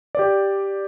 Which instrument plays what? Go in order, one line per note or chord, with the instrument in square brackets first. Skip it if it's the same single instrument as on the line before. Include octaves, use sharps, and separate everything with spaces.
[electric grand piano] G4 D5